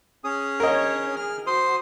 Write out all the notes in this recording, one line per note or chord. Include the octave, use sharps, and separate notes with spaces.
C#4 G#4 D#6
D4 A#4 C#5 D#5
G#4 F6
F#4 C5 C6 D#6